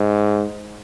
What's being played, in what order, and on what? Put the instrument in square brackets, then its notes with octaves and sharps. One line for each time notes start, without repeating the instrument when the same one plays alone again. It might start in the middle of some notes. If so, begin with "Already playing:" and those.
Already playing: [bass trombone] G#2